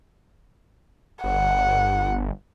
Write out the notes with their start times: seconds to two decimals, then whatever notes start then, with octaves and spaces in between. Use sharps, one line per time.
1.24 G1 F#5